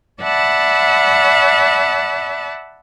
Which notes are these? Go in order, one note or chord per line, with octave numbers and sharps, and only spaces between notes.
D5 E5 F#5 A5 B5